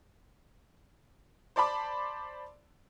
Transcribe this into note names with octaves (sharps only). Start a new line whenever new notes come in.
C5 D5 A5 B5 D6